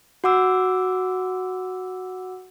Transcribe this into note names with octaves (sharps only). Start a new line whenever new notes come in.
F#4 F#5 D6 E6